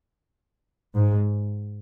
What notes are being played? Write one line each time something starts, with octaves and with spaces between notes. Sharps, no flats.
G#2